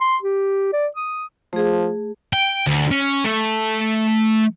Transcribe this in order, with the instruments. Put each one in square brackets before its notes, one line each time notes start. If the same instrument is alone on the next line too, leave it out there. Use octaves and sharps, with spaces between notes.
[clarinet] C6
G4
D5
D#6
[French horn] F3 [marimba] A3 G#4
[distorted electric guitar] G5
D2
C#4
A3